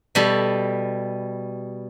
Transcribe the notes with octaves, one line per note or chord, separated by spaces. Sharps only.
B2 G3 A4